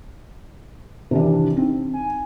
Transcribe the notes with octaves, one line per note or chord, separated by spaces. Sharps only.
C3 D#3 E3 D4
C4 D#4
G#5